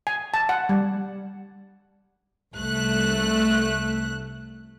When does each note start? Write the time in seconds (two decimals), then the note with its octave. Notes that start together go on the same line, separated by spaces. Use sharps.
0.07 G#5
0.34 A5
0.49 F#5
0.69 G3
2.55 C2 A3 F#6